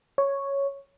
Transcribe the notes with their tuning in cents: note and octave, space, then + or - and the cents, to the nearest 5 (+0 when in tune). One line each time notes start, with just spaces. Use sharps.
C#5 +0